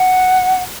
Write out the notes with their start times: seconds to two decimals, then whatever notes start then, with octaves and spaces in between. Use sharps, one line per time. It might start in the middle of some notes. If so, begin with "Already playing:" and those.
Already playing: F#5